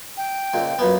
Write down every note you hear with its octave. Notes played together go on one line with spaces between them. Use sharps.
G5
C#2 A#2
F#2 A#2 B3 B4